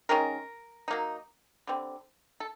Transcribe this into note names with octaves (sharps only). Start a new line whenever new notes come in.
D#3 G#3 C#4 A#4
F#3 A#3 D#4
D3 G3 C4
A4